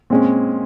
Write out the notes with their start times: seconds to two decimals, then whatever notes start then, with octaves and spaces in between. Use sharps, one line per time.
0.10 A#2 G#3 C4 C#4